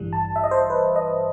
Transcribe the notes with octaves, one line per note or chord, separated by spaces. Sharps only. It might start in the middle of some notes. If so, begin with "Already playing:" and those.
Already playing: A1 G2 E3 G3
A5
E5
D#5
C5
B4
D#5